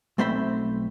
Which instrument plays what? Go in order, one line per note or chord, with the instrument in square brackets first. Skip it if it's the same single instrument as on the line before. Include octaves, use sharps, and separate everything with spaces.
[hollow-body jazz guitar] B1 A3 C4 C5 E5 B5